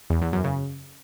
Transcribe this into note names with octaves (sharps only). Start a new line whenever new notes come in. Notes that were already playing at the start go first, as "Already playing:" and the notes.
E2
E2
F#2
C#3